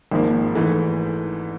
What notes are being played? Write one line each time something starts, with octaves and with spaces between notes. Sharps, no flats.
G#1 G#2 F3 A#3
G#2 E3 A3